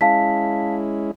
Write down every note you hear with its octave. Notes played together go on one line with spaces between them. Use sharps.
G#3 C#4 E4 F5 A5 B6